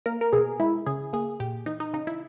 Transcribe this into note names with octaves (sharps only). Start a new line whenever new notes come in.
A#3 A#4
A#4
B2 G#4
G#3 E4
C#3 G#4
A#3 G#4
A#2 G4
E3 D#4
D#4
C#3 D#4
E4